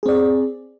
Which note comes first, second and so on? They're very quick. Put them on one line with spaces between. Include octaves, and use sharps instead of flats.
G#4 C4 D5